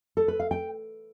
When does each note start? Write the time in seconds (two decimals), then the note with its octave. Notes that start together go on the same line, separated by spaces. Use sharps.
0.17 A4
0.28 B4
0.40 F5
0.51 G5